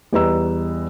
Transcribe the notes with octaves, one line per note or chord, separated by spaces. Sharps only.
E2 G3 B4 D#5 A#5 E6